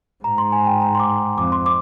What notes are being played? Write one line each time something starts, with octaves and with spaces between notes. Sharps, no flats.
G#2 A#5
C6
G#5
G5
A#5
C6
D6
F2 D6
C6
D6